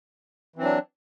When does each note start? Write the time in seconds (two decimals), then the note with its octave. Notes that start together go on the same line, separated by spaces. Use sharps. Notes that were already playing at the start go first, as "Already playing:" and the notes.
0.56 E3
0.58 C4
0.61 F#3
0.64 D4